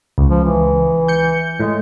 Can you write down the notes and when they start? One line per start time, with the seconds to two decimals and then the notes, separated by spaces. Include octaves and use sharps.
0.18 C#2
0.30 F3
0.44 E3
1.08 G6 C#7
1.60 A2 G#3